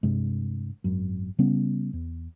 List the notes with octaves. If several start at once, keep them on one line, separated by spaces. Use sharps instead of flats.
G2 C3 G#3
G#1 F#2
C#3 G3 B3 C#4
E2